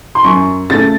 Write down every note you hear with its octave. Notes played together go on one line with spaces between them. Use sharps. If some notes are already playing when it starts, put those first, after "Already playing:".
C6
F#2 C#6
C#3 A3 A6